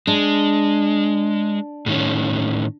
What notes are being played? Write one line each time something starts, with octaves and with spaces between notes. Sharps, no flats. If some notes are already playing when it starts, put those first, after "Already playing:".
G#3 D4
A2 D#3 C#4